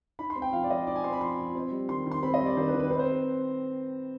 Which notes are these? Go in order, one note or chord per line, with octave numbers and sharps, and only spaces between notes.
D#4 B5
C6
C4
G5
F3 F5
D5
F3 D#5
D#4 D5
G#5
C4 C6
B5
F3 C6
F3
C4
G3
D#3 C6
D#3
C6
C4 B5
D#5
G3
D5
D#3 C5
B4
D#3
B4
C4 B4
C5